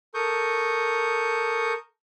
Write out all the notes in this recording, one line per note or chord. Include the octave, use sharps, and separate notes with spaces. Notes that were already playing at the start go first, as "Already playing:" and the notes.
A4 A#4 C#6 D#6 G6